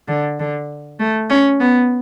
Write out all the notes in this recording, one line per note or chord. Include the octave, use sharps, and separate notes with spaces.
D3
D3
A3
C#4
B3